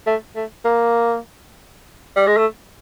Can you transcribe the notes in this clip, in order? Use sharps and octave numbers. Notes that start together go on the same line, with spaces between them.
A3
A3
A#3
G3
G#3
A3